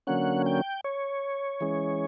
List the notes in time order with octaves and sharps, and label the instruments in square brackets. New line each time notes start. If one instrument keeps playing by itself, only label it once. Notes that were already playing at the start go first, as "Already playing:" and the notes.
[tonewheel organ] D3 F#3 A#3 C#4 F#5
G5
C#5
E3 G#3 C#4